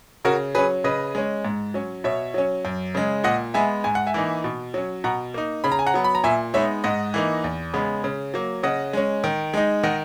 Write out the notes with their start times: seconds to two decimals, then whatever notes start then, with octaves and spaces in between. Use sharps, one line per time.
0.25 C#3 F#4 A#4
0.55 F#3 C#4 G#4 B4
0.84 C#3 B4 D#5
1.15 G#3 C#4
1.45 G#2
1.74 F#3 C#4
2.04 B2 C#5 E5
2.34 F#3 C#4
2.65 F#2
2.95 C#3 G#3
3.24 A#2 D#5 F#5
3.54 G#3 B3 E5 G#5
3.84 G#2 G#5
3.95 F#5
4.07 E5 G#5
4.14 E3 A#3 D#4
4.44 B2
4.74 F#3 C#4
5.04 B2 F#5 A#5
5.34 A#3 D#4
5.64 C#3 B5
5.72 A#5
5.79 G#5
5.87 F#5 A#5
5.94 F#3 B3
6.04 B5
6.15 A#5
6.24 A#2 E5 G#5
6.54 G#3 B3 D#4 C#5 E5
6.84 G#2 D#5 F#5
7.14 E3 A#3 D#4
7.44 E2
7.74 C#3 G#3 B3
8.04 C#3
8.34 F#3 A#3
8.63 C#3 D#5 F#5
8.93 G#3 C#4
9.24 D#3
9.54 G#3 D#4
9.83 D#3 D#5 F#5